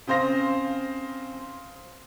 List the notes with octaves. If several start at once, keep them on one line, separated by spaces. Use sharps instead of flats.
C#3 C4 C5 F5 A#6